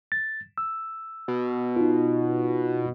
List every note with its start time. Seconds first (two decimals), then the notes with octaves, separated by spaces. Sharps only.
0.12 A6
0.58 E6
1.28 B2
1.76 D#4 F4